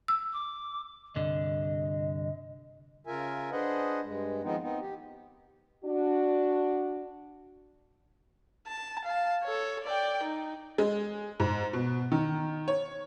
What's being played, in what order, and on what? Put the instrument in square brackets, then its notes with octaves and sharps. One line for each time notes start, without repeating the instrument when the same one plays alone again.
[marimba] E6
[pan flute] D6
[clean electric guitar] C2 G2 D3 [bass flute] D#5
[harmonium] C#3 F4 A#4 E5 G#5
D4 G#4 B4 C5 D#5 F#5
G2 G#3
D#3 F3 G#3 B3 C4 D#4
B3 C4 D#4
G4
[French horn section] D4 F#4
[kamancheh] A5
F5 A5
A4 C#5
D5 G5
D#4
[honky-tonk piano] G#3
G#2
B2
D#3
C#5